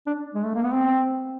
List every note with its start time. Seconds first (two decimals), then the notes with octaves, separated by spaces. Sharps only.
0.07 D4
0.34 G#3
0.45 A3
0.54 A#3
0.64 B3
0.74 C4